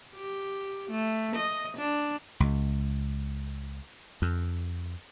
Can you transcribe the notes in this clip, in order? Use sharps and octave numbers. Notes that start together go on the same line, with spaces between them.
G4
A3
D#5
D4
C#2
F2